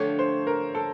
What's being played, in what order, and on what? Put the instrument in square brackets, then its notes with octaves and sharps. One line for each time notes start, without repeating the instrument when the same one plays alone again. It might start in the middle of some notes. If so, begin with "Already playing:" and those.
Already playing: [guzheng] D3 F3 A3 D4 G4 [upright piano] C#5
[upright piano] C5
A#4
A4